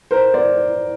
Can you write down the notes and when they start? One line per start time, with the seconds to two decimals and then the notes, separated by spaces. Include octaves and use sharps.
0.11 A#4 C5
0.34 C5 D5